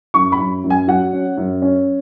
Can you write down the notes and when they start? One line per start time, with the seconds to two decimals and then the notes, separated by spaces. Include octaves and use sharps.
0.14 F#2 C#6
0.32 B5
0.39 F#2
0.64 F#2
0.70 G#5
0.88 F#3 F#5
1.13 C#4
1.37 F#2
1.62 C#4